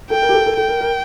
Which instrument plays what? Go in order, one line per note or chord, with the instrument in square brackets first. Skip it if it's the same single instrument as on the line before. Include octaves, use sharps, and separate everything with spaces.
[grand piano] A4 [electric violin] G5
[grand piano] A#4
G4
A4
A4
[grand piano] A4 [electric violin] G5
[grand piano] A#4
A#4